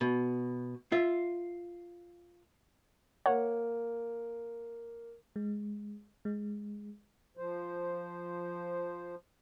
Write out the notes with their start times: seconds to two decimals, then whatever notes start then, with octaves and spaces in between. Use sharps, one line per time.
0.01 B2
0.92 F4 E5
3.26 A#3 C#5 F#5
5.36 G#3
6.25 G#3
7.37 F3 C5